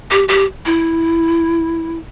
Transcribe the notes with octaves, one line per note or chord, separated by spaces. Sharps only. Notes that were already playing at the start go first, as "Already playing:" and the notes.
G4
G4
E4